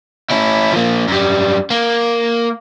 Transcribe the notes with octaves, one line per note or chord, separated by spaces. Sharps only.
C#4 E4
F3 A#3
F#2 G3
A#3